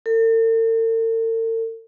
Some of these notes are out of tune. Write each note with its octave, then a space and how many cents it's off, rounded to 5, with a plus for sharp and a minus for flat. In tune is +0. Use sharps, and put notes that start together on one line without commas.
A4 +45